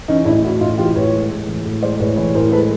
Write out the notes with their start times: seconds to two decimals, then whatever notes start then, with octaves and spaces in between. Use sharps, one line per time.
0.08 E3 C#4 D#4
0.25 A2 D4 E4
0.43 A3 E4 F#4
0.60 A2 D#4 F4
0.78 E3 F4 G4
0.95 A2 B4 C#5
1.12 G#3
1.30 A2
1.48 E3
1.65 A2
1.82 G#3 C5 D5
2.00 A2 B4 C#5
2.17 E3 B4 C#5
2.35 A2 A#4 C5
2.52 G#3 A4 B4